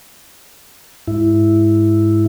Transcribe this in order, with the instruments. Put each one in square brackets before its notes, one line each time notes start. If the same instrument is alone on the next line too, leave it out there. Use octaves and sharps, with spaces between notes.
[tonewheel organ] G#2 E4